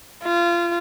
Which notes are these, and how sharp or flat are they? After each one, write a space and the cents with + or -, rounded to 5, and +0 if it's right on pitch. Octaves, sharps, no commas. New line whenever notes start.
F4 -25